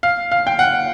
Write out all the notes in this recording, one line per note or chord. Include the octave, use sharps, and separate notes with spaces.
F5
F5
G5
F#5